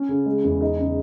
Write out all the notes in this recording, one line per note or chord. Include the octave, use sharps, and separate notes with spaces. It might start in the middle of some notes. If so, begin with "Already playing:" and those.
Already playing: C#4
C#3
G#3
E2
D#4
C#3